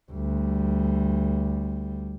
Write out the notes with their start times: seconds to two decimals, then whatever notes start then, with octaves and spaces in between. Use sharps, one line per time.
0.12 D2 G3